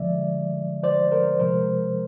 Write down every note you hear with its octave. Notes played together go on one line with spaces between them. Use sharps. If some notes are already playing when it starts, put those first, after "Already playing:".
Already playing: D3 F3 G#3 D5 E5
C5 D5
A#4 C5
C3 F3 G#3 A#4 C5